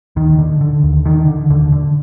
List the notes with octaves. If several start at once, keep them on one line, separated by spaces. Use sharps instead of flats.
D#2 D#3
D3
D3
D#2
D3 D#3
D3
D#2 D3
D3